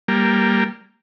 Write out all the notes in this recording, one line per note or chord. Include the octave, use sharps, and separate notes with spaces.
G3 A#3